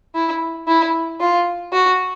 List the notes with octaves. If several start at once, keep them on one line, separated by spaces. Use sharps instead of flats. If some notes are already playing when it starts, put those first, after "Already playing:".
E4
E4
F4
F#4